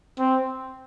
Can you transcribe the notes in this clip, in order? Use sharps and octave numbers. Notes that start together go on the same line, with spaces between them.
C4